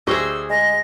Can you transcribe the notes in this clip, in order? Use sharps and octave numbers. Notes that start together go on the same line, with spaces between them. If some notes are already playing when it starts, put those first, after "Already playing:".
D2 G4 G#4 C5 D#5 C#6 E6
G#3 A#6